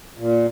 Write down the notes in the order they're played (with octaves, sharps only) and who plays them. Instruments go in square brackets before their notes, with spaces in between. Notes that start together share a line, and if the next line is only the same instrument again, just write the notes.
[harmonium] A#2